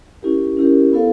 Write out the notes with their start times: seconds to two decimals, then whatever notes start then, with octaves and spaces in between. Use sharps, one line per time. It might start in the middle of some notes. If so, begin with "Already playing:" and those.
0.22 C#4 E4 G4 A#4
0.57 C#4 E4 G4 A#4
0.93 B3 E4 A4 C5 F5